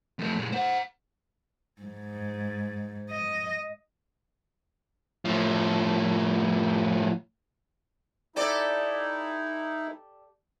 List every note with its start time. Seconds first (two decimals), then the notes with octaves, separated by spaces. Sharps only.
0.19 F2 A3
0.35 A#2 G#3
0.52 C5 F#5
1.82 G#2
3.10 D#5
5.25 A2 F3
8.36 D#4 E4 G4 A4 D5